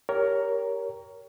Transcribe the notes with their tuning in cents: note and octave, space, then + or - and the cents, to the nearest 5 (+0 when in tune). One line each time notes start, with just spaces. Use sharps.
G4 +0 A#4 +0 C#5 +20